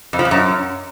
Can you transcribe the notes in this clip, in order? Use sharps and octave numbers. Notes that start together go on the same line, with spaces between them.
F2
F3
F2
F#2